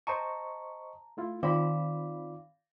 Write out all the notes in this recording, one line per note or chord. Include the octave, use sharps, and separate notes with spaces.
C5 D#5 A5 A#5 C#6
A3 E4 F4
D#3 C4 F4 D5 F5 B5 D6